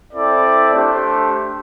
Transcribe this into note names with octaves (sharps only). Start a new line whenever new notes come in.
C4 E4 A4 D5
A3 D4 G4 C5